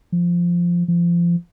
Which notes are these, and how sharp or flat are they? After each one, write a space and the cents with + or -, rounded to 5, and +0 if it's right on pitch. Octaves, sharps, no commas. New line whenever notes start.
F3 -5
F3 -25